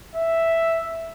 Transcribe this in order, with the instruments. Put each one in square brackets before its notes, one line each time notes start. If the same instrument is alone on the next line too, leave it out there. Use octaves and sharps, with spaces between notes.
[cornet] E5